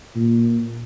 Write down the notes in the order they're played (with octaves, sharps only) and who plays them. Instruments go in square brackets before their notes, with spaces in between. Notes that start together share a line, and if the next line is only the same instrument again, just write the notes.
[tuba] A#2